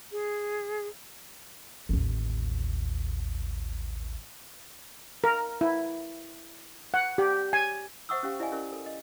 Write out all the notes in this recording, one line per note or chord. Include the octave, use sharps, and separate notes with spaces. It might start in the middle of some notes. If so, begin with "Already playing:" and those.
G#4
A1 D#2
A#4
E4
F#5
G4
G#5
C5 E5 F#5 C#6 D#6 E6
C#4 G4 F5 G5
E4 D5 D#5 F5 G#5
C#4 E4 A#4 D5
A4
D#5